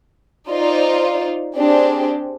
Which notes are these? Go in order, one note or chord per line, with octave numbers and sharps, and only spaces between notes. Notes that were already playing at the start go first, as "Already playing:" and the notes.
D#4 F4 C5 D5
C4 D4 G4 G#4 C5 D5